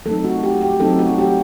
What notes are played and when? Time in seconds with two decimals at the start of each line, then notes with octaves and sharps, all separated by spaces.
0.06 F#3 A3 C4 D#4 A4
0.25 F#4
0.43 G4
0.61 G4
0.80 F#3 A3 C4 D#4 A4
0.99 F#4
1.18 G4